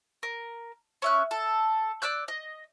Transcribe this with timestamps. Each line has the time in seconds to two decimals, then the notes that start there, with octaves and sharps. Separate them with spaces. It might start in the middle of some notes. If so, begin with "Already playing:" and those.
0.23 A#4
1.02 C#4 E5 F#6
1.31 A4
2.02 D5 E6 F#6 G6
2.28 D#5